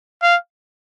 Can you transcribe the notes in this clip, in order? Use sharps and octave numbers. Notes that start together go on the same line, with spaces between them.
F5